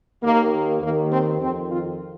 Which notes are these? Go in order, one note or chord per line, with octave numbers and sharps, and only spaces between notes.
D#2 D#3 A#3
D#2 D#3 A#3
C4
F2 D#3 C4
F4